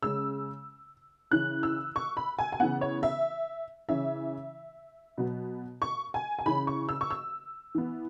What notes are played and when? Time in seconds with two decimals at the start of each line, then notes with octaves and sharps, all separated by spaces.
0.03 C#3 G#3 C#4 E6
1.31 C#3 E3 C#4 F#6
1.63 E6
1.96 C#6
2.17 B5
2.39 G#5
2.52 G#5
2.60 C#3 E3 B3 F#5
2.81 C#5
3.03 E5
3.89 C#3 E3 C#4 E5
5.18 B2 F#3 B3
5.82 C#6
6.14 G#5
6.39 G#5
6.46 C#3 E3 C#4 B5
6.67 C#6
6.89 E6
7.01 C#6
7.11 E6
7.75 E3 B3